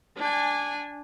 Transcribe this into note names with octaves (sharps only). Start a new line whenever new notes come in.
D4 G#5